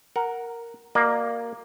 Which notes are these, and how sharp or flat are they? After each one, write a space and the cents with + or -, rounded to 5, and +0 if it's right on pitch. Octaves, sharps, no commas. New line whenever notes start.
A#4 +0 F#5 +0
A#3 +0 F#4 +0 D5 +35